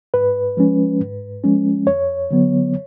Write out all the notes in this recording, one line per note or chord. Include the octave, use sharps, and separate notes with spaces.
G#2 B4
F3 G#3 C#4
G#2
F3 G#3 C#4
F2 C#5
D3 F#3 B3